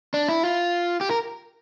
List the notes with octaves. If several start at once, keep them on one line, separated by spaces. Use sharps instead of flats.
D4
E4
F4
G4
A#4